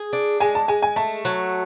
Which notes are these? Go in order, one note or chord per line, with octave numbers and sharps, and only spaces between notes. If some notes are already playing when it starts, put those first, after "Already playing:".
Already playing: G#4
D4
G#3 G#5
A5
G#3 G#5
G#5
A3 A5
F#3